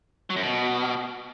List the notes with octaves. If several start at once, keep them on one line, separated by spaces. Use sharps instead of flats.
F#3
F#2
B2